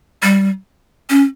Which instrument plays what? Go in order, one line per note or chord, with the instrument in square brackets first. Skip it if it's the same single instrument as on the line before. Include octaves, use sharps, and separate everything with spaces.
[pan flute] G3
C#4